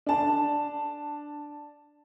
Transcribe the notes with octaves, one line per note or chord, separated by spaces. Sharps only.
D4 A5